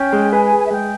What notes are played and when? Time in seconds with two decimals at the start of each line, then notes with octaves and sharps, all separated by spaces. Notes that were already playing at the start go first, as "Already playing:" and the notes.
Already playing: C#4 G5
0.13 G#3
0.32 B4 G#5
0.45 G#5
0.52 G#4
0.58 G#5
0.66 E5
0.71 G#3 G5